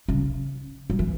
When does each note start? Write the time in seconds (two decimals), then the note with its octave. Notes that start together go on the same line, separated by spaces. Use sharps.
0.08 C#3
0.90 F#3
0.99 E3